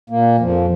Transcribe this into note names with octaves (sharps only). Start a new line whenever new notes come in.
A#2 A#3
F2 F3